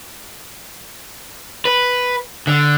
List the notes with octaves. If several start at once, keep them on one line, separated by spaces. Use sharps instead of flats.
B4
D3